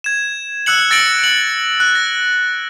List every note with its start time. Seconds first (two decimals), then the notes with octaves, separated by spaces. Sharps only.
0.04 G#6 E7
0.66 E6 F#6 C#7 F#7
0.90 E6 A6 A#6 C#7 D7 F#7
1.21 C#7 F#7
1.80 F#6
1.95 A#6